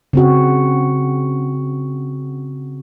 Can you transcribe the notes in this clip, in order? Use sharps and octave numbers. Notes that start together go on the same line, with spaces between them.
C#3 C4 F#4